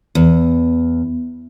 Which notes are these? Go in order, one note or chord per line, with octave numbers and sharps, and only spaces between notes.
E2